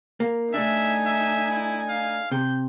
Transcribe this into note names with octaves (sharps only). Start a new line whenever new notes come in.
A#3
A3 D4 D#4 E5 G#5
E5
E4
F5
C3 G6